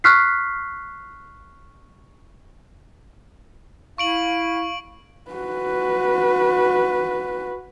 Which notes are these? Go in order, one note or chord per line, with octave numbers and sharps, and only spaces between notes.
C#6 F6 F#6 B6 C7
E4 F5 C#6 D7 F#7
F#4 B4